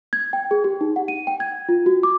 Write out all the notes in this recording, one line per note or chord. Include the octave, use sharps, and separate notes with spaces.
G#6
G5
G#4
G4
D#4
F#5
D#7
G5
G#6
F4
F#4
D6